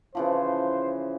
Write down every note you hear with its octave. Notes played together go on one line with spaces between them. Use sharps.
C#3 E3 F3 C5